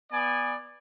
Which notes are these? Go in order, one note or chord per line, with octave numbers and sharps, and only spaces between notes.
B3 D5 G#5